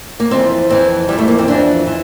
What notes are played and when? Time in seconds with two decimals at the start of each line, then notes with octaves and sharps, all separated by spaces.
0.20 A#3
0.31 F2 E3 C4
0.70 F2 E3 C4
1.08 F2 E3 G3
1.18 A3
1.28 A#3
1.38 C4
1.48 F2 E3 D4
1.87 E3